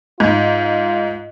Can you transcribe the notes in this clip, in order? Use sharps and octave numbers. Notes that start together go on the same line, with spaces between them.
G#2 F4